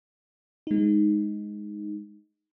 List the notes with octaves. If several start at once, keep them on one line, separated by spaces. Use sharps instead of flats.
G#3 D#4